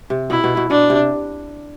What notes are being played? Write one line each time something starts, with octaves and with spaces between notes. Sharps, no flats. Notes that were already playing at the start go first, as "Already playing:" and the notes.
C3
B2 E4
B2
B2
B2 D4
C3